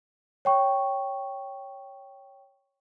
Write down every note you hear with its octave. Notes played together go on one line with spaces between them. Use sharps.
C#5 G5 C#6